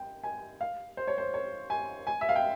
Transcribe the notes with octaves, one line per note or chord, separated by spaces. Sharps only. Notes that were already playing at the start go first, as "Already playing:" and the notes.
Already playing: G5
G#5
F5
C5
C#5
C5
C#5
G#5
G#5
E5
F5
G5